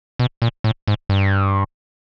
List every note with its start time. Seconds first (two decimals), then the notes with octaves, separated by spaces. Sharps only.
0.19 B2
0.42 A#2
0.64 A2
0.88 G#2
1.09 G2